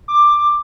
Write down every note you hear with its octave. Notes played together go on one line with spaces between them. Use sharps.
D6